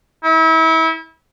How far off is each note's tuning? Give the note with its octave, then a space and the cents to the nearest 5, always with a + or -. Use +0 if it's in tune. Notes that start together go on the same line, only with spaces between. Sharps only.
E4 -35